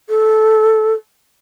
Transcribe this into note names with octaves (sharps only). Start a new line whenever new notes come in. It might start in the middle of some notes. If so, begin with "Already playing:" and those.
A4